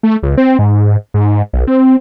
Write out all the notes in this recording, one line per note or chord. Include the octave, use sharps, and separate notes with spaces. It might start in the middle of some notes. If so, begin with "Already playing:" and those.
A3
C#2
C4
G#2
G#2
B1
C4